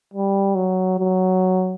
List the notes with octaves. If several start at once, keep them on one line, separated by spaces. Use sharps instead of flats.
G3
F#3
F#3